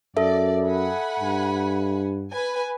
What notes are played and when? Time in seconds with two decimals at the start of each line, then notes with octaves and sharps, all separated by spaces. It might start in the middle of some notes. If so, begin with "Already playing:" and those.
0.17 F#2 A4 D5 E5
0.66 F#5 G#5 B5
1.20 G2
2.31 B4 G#5